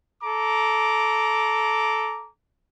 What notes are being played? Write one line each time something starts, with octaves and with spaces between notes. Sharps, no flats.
A4 A#5 D6